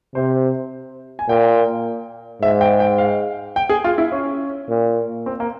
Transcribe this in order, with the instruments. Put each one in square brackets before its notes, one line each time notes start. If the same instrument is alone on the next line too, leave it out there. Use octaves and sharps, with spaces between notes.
[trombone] C3 [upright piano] C5
[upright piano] G#5
[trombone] A#2 [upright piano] G5
[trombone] G#2 [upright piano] E5
[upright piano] G5
G5
F5
G5
G#4
F4
E4
C#4
[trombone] A#2
[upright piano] C4
A#3